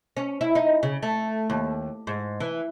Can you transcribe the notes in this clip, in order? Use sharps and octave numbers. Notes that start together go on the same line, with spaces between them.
C#4
E4
D#4
C#3
A3
D#2
G#2
E3